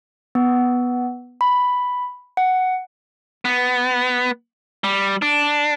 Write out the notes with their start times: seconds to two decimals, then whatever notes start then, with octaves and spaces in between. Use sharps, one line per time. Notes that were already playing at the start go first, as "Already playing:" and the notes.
0.35 B3
1.41 B5
2.37 F#5
3.45 B3
4.84 G3
5.22 D4